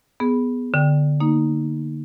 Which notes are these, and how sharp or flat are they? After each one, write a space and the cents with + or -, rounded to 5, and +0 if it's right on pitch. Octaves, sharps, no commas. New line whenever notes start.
B3 +0 G#4 +0
D3 +0 G5 +0
A#3 +0 D#4 +0